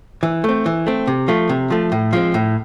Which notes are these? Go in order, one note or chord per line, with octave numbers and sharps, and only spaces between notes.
E3
A3 C4
E3
A3 C4
C3
F3 A3
C3
F3 A3
A2
F3 G#3 C4
A2